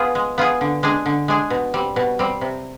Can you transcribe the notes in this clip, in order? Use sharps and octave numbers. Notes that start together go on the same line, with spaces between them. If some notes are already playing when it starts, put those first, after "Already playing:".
Already playing: B3 F4 G#4
G#3
B3 F4 G#4
D3
G#3 D4 G#4
D3
G#3 D4 G#4
B2
G3 C4
B2
G3 C4
C3